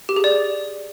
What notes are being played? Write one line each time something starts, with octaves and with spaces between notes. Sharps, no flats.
G4
G#4
D5